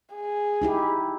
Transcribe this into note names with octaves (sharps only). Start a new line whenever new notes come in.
G#4
D#4 E4 G4